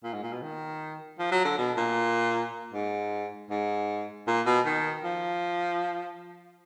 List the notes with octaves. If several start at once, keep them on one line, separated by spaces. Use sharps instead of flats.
A#2
G#2
A#2
B2
D#3
F3
F#3
D3
B2
A#2
G#2
G#2
A#2
B2
D#3
F3